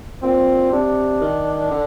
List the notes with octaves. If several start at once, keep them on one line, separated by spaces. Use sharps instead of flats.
A#2 C4
C3 D4
D#3
D3